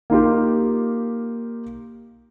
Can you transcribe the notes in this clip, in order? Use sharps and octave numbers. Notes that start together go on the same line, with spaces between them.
A#3 D#4 F4 G4